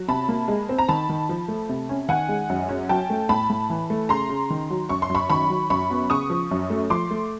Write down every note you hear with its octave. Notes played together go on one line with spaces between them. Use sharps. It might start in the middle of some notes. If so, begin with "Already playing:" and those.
Already playing: F#3
C3 A5 B5
A#3
G#3
C4
A#5
D#3 A5 B5
D#3
F3
A3
C3
C#4
D#3 F#5 G#5
G#3
F#2
C#4
F#3 G5 A5
A3
A2 A5 B5
A2
E3
A3
C#3 A#5 C6
C#3
D#3
F#3
F#2 C#6
C6
F#2
B5 C#6
D#3 B5 C#6
F#3
F#2 B5 C#6
B3
C#3 C#6 D#6
F3
F#2
A3
F3 C6 D6
A3